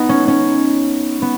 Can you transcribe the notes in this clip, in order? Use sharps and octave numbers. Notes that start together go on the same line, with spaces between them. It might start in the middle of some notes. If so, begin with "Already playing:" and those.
Already playing: B3 D#4
C#4
C#4
B3